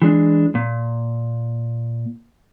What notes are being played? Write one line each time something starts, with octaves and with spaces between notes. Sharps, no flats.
E3 G#3 D4
A#2